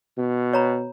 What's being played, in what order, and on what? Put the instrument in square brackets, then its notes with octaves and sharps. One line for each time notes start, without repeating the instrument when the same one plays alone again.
[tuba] B2
[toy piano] C#5 A#5 B5